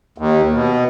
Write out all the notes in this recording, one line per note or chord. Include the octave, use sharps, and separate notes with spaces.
D#2
B2